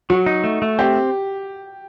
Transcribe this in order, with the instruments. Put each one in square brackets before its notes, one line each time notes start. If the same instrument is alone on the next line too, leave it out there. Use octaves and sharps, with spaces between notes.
[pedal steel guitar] F#3 [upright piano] F#4
[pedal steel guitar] D#4
A3
A3
[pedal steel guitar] C4 [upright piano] G4